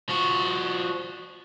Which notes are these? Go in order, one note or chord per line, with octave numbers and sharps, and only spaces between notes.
F3 F#4